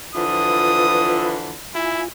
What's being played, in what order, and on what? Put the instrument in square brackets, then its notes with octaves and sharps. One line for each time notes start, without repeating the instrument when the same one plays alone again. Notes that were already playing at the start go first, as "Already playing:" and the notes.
[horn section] D3 E3 F3 [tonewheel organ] F4 B4 [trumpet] D#6
[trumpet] E4 [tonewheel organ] F4 G#5